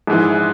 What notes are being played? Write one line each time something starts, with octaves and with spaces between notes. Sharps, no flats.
A#1 G#2 E3